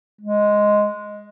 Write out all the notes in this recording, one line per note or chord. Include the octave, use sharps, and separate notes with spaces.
G#3